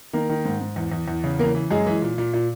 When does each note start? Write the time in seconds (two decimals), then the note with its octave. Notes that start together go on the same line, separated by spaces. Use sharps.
0.13 D#3 A#3 A#4
0.29 D#3
0.45 G#2
0.61 G#2
0.76 E2
0.92 E2
1.08 E2
1.24 C#3
1.39 E3 A#3 A#4
1.55 E3
1.70 F#2 G#3 G#4
1.86 E3
2.02 A#2
2.18 A#2
2.33 A#2